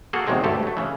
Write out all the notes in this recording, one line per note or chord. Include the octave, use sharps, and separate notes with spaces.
A#3 F#4 G#4 A4 F5 F#5
E2 C3 D#3 F#3 G#3 C4
D2 G2 A3 G4 A4
F#3 A3
C#3 E3